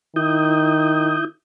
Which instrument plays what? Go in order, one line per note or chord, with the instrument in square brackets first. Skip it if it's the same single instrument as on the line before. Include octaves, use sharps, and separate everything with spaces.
[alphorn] D#3 [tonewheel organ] E4 D#6 G6